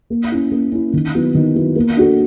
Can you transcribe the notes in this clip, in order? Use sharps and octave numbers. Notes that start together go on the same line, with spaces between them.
A#3
C#4 E4
A#3
C#4 E4
D#3
F#3 B3 E4
D#3
F#3 B3 E4
A#3
D4 F#4 A4